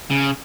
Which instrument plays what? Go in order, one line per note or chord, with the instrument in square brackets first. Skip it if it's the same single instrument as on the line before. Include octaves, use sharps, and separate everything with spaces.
[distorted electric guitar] C#3